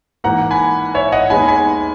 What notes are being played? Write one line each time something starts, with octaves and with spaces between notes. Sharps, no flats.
G#2 E3 A#3 F#5 A#5
G#5 B5
C#5 E5
D#5 F#5
D#2 D#3 G#3 B3 G#5 B5
G#5 B5